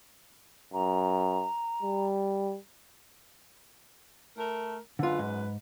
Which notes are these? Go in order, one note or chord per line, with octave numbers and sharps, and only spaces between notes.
F#2 A#5
G3
A3 A#4
F#2 D3 G#3 F4 B4
G#2